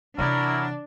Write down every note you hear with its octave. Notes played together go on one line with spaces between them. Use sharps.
C3 E3 F#3 D4 E4 A#4